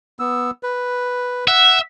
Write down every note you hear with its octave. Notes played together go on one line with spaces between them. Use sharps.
B3 E6
B4
E5 F#5